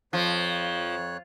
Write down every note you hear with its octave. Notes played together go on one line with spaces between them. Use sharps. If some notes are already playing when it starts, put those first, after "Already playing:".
F2 F3 C#5 F#6